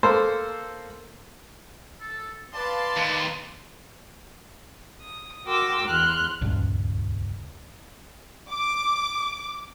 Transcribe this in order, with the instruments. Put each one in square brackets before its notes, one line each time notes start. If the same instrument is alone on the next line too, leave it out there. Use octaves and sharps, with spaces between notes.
[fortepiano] A#3 A4 C5
[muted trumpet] A4
[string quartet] B4 [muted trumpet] D5 [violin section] F5 A5 C6
[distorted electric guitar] D#2
[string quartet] D#6
F#4 A#4 G5 C6 D6 E6
E2 E3 C6 F6 F#6
[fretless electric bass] D#1 C#2 G2
[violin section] D6